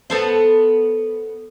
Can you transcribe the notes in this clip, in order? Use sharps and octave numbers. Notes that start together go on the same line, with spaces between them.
B3 A4 C5